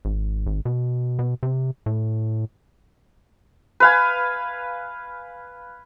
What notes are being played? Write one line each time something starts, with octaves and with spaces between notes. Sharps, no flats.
G#1
G#1
B2
B2
C3
A2
B4 F5 G#5